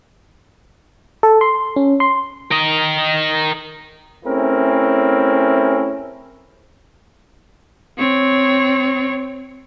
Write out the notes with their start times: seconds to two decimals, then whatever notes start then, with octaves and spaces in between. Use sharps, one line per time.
1.23 A4
1.41 C6
1.76 C#4
2.00 C6
2.51 A#4 D#5
4.25 A3 C4 C#4 E4 G#4 A#4
7.98 C4 C#5